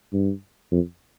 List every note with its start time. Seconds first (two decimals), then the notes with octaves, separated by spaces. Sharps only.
0.12 G2
0.71 F2